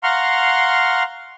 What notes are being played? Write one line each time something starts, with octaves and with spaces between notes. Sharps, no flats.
F5 F#5 A#5 C6 C#6 F6